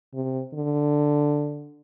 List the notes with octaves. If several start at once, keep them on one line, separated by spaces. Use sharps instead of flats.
C3
D3